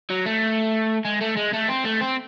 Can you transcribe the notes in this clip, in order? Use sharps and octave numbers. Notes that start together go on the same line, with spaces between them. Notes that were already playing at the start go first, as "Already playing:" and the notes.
F#3
A3
G#3
A3
G#3
A3
C4
A3
C4